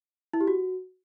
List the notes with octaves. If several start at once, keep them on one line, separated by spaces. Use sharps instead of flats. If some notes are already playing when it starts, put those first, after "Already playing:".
E4
G4
F#4